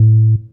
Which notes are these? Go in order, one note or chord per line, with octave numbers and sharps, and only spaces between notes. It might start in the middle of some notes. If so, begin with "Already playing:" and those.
Already playing: A2